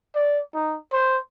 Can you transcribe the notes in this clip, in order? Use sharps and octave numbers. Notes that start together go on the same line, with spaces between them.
D5
D#4
C5